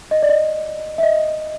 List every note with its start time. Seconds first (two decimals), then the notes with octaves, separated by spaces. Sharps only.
0.11 D#5
0.22 D5
0.29 D#5
0.98 E5
1.03 D#5